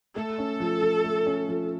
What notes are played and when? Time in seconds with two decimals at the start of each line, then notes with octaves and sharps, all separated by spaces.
0.16 A3 A4
0.38 C#4
0.60 F3
0.82 F3
1.04 A3
1.26 C#4
1.49 F3